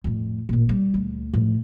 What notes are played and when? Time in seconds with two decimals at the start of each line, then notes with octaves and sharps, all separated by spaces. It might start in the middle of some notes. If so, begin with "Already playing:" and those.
0.04 F2 A2
0.49 A1 A#2
0.69 G3
0.94 D2
1.34 A2 F3